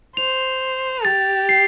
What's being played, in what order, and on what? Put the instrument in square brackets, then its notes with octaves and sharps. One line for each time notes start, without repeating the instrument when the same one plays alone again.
[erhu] C5 [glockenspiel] F7
[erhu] G4 [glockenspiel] A6
[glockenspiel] C7